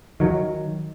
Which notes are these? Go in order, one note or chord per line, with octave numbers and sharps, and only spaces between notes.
D#3 F#3